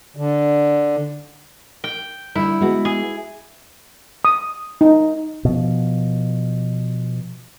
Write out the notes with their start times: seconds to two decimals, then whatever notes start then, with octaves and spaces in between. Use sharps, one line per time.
0.17 D3
1.84 G5
2.35 D3 G3 E4
2.61 G#3 B3 F#4
2.85 G#4
4.25 D#6
4.81 D#4
5.45 B2 F3